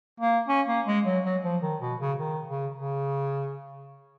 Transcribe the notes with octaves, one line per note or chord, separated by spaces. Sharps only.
A#3
C#4
A#3
G#3
F#3
F#3
F3
D#3
B2
C#3
D#3
C#3
C#3